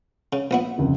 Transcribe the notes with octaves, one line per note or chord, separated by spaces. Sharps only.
C#3
A#1 B3 E4
F1 C#2